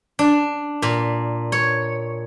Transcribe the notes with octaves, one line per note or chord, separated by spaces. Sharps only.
D4
A#2
C#5